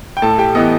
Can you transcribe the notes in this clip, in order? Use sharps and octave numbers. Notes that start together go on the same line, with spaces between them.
G5
A2 A4 A5
G4 G5
E3 B3 D#5 D#6